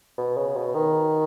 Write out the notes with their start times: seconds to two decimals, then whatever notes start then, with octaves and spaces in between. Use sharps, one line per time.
0.18 B2
0.37 C#3
0.56 B2
0.75 D#3